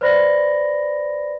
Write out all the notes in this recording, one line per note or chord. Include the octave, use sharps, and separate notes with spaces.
B4 C5 D5 B5 A#6